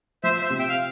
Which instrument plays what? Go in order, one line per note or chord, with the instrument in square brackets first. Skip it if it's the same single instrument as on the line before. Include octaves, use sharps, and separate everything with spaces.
[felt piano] F3 [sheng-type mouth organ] C5 E5
[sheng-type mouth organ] C5 E5
[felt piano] C3
[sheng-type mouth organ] E5 G5
F5